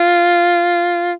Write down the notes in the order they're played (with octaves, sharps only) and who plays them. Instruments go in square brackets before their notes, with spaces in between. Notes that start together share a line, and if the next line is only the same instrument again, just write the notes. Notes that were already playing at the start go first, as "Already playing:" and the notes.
Already playing: [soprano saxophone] F4